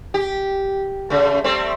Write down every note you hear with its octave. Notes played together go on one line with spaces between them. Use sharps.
G4
C#3 A3
G3 A3 C4